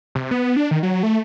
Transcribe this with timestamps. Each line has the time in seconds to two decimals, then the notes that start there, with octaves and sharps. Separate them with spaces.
0.15 C3
0.31 B3
0.56 D4
0.71 D#3
0.83 F#3
1.03 A3